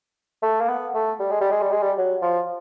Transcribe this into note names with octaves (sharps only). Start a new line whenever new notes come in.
A3
A#3
B3
A3
G3
G#3
G3
G#3
G3
G#3
G3
F#3
F3